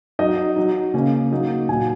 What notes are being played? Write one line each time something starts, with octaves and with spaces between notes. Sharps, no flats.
F#3 D#4 D#5
F#3 D#4
C#3 A#3 C#4
F#3 A#3 D#4
A#2 F#3 A#3 D#4 G#5